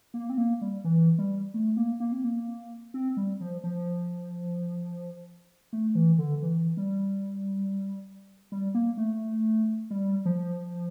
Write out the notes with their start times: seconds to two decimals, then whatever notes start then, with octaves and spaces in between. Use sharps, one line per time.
0.14 A#3
0.30 C4
0.38 A#3
0.61 G3
0.84 E3
1.18 G3
1.54 A3
1.77 A#3
2.00 A#3
2.12 C4
2.24 A#3
2.94 C4
3.17 G3
3.41 F3
3.64 F3
5.73 A3
5.95 E3
6.18 D3
6.42 E3
6.77 G3
8.52 G3
8.75 A#3
8.97 A3
9.90 G3
10.25 F3